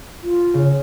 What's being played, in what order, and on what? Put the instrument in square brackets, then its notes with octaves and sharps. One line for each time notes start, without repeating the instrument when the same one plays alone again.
[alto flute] F4
[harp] C#3